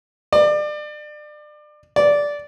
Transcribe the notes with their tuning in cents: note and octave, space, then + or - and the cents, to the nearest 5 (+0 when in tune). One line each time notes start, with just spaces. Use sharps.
D5 +30
D5 -10